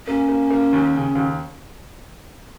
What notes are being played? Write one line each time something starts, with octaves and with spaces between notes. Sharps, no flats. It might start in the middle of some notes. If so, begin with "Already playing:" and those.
A#3 C#4
A#3
A#3
D#2
C#3
D#2